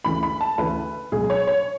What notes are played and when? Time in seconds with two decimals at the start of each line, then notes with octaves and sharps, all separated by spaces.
0.04 D2 C#3 E3 B5
0.23 B5
0.41 A5
0.58 D2 C#3 E3 B4
1.12 C#2 B2 F#3 G#4
1.30 C#5
1.47 C#5